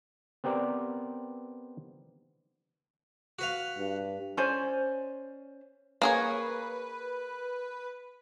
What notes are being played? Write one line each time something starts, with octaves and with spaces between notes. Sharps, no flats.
B3 C4 G4 A#4 D5
F#4 B4 F5
G2
C#4 C5 D5 G#5
A#3 G#4 B4 C#5